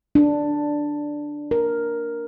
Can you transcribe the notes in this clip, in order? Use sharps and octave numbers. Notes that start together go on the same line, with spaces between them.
D4
A#4